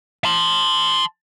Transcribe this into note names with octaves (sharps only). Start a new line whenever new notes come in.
A5 C6